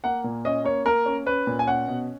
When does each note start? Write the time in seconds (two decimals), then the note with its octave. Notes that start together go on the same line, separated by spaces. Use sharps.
0.04 A#3 F#5
0.24 A#2
0.45 C#4 D#5
0.64 A#3 C#5
0.86 A#3 A#4
1.06 C#4
1.26 C#4 B4
1.47 A#2
1.59 G#5
1.67 C#4 F#5
1.88 B2